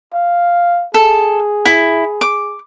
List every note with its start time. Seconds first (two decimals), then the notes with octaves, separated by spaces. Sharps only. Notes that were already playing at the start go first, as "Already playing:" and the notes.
0.14 F5
0.94 G#4 A4
1.65 E4
2.21 D6